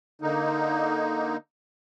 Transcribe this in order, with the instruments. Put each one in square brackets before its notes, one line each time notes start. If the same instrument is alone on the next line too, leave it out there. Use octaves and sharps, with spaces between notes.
[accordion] D3 A#3 D#4